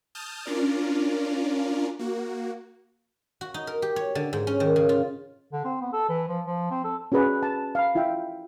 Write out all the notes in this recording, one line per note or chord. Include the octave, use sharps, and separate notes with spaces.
A5 D#6 F6 G6
C#4 D4 F4 A#4 D5
A#3 F#4
F#4
D#4
A#4
G4
C#5
D3
G#2
C#4
D#3
C#3
F4
D3
C4
B3
A4
E3
F3
F3
C4
A4
C#4 F#4 G#4 B4 D5
A5
F5 B5
E4 F4 E5 G5